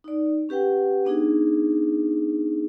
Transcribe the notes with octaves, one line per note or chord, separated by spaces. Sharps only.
D#4 D5
C#4 G4 B4 F#5 G5
B3 D4 D#4 G#4